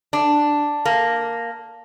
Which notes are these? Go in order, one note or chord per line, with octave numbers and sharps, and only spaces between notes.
D4
A#3